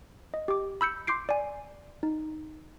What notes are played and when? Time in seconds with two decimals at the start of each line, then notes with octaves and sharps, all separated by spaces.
0.34 D#5
0.48 G4 D6
0.81 B5 E6 G6 C#7
1.07 C6 D6 G6 C7 D7
1.29 D5 G#5
2.03 D#4